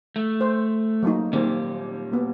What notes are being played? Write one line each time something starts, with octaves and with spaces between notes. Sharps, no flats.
A3
C5
F#3 A#3 D#4
A#2 D#3 G3 A#3 C4
A#3 B3